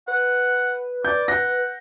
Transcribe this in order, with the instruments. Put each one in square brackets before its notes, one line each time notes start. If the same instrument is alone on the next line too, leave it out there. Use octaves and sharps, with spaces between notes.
[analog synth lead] B4 [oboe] F#5
[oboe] D5 [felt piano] G6
[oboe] F#5 [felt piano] A#6